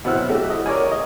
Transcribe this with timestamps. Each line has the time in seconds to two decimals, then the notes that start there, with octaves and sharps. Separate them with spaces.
0.05 B2 C4 E4 F#5 E6 F#6
0.17 F#3
0.29 A3 E4 F#4 G4
0.50 D#5
0.66 A#4 C#5 D5 G#5
0.92 D#5